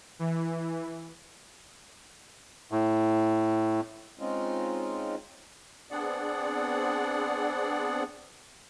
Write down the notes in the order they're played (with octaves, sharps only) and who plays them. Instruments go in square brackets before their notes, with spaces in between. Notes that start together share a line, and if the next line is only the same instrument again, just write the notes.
[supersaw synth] E3
[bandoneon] A2
[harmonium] G#3 C4 C#4 D#4 F4
[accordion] B3 C4 D4 G#4 D5 F#5